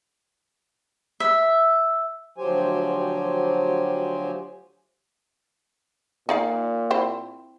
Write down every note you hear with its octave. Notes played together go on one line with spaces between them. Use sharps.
E5
D2 F3 F#3 G4 C5 G#5
A#2 D#4 D5 F5
C4 E4 C5